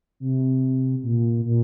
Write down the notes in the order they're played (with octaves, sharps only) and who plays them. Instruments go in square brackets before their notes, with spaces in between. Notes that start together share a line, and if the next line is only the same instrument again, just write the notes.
[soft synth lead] C3
A#2
A#2